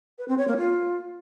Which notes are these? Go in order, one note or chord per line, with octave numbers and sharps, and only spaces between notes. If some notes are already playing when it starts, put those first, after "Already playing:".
B4
C4
C#5
A#3
F4